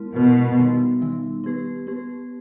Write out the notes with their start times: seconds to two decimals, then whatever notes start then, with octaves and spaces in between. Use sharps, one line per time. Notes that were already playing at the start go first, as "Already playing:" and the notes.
Already playing: G#3 B3 E4 A#4
0.16 B2 G#3 B3 E4 A#4
0.58 D#3 G3 B3 D#4
1.02 D#3 G3 B3 D#4
1.44 B3 G4 B4
1.87 B3 G4 B4